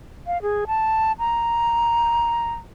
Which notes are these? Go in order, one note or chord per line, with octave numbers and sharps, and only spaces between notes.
F5
G#4
A5
A#5